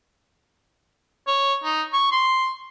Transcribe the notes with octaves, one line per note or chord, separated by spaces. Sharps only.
C#5
D#4
C#6
C6